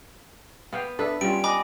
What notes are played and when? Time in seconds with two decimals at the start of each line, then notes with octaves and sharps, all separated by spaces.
0.73 B3 F5 G5
0.99 D4 A4 B4 E5
1.21 G3 C#4 F4 D7
1.44 D#5 G#5 B5 D6